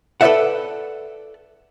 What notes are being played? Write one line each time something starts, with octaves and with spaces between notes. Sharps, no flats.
A4 B4 C5 D5 E5 F#5